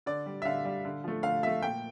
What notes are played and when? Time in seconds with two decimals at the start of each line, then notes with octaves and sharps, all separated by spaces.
0.06 D3 D5
0.26 G3
0.42 E5
0.45 D3 F5
0.65 G3
0.85 D3
1.04 F3 A3
1.23 D3 F5
1.43 F3 A3 E5
1.62 A#2 G5